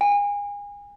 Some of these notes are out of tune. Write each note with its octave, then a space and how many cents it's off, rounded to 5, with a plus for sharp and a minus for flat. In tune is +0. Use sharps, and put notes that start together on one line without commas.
G#5 -30